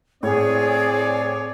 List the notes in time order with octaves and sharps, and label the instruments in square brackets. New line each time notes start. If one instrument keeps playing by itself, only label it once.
[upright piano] A2 [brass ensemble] C4 D5 [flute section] G#4 [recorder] C#5